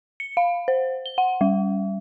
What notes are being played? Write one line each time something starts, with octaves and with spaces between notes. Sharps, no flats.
C#7
F5
C5
G7
F#5
G3